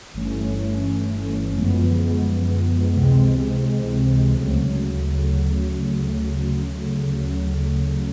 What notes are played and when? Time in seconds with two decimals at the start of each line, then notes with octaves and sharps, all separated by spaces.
0.13 G1 G2 E3 A3 C#4
1.54 F#2 D3 F3 G#3 B3
2.95 C#2 C3 E3 G#3 C4
4.35 D2 C#3 F#3 A3